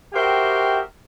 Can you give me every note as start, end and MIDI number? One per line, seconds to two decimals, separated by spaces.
0.14 0.80 66
0.14 0.80 67
0.14 0.80 70
0.14 0.80 72
0.14 0.80 76
0.14 0.80 79